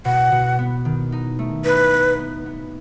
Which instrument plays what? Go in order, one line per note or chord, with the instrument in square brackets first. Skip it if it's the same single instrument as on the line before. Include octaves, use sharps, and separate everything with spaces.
[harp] B2 [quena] F#5
[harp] B2
B3
D#3
D#4
A3
[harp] D#4 [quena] B4
[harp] B3
B3
B3